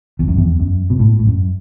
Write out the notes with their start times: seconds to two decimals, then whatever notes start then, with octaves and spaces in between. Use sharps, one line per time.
0.19 E2
0.28 F#2
0.37 E2
0.59 F#2
0.90 B2
0.99 A2
1.19 A2
1.26 F#2